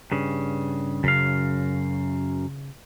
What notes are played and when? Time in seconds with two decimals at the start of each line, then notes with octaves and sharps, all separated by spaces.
0.12 G2 C#3
1.04 F#2 C#3 F5